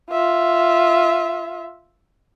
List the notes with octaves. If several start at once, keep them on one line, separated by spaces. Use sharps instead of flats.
F4 E5